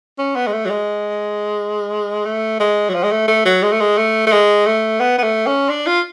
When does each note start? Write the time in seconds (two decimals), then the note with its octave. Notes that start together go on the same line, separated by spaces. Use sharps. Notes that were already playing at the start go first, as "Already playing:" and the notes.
0.18 C#4
0.36 B3
0.47 G#3
0.53 A3
0.65 F#3
0.70 G#3
2.25 A3
2.60 G#3
2.89 F#3
2.94 F3
3.03 G#3
3.11 A3
3.28 A3
3.45 F#3
3.63 G#3
3.72 A3
3.80 G#3
3.97 A3
4.27 A3
4.32 G#3
4.66 A3
5.00 B3
5.18 B3
5.23 A3
5.46 C#4
5.69 D4
5.87 F4